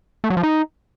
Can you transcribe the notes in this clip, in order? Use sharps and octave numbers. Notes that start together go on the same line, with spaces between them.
A3
F#3
F3
D#4